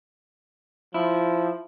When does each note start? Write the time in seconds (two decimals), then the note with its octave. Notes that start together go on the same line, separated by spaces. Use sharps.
0.94 F3 E4